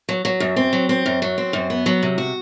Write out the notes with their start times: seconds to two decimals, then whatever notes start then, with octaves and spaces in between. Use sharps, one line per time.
0.09 F#3
0.25 F#3
0.40 F#2
0.56 C4
0.73 F#3
0.89 C4
1.06 F#2
1.22 F#3
1.38 C4
1.53 F#2
1.70 B3
1.86 F#3
2.03 C3
2.18 F#4